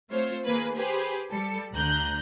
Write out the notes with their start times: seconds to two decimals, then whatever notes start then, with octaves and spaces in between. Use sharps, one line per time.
0.10 A3 C4 F4 C5 C#5
0.45 D#3 A#3 G#4 B4
0.77 G4 G#4 B4 C5
1.30 G3 A4 C#7
1.73 D2 D3 A#5 F#6 G6